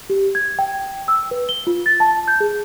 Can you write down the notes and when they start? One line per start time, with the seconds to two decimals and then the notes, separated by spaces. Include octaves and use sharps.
0.10 G4
0.35 G#6
0.59 G5
1.08 E6
1.31 B4
1.49 G7
1.67 F4
1.86 A6
2.00 A5
2.28 G6
2.40 G#4